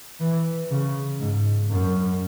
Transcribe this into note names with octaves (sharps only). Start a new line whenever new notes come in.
E3
C#3
G#2
F#2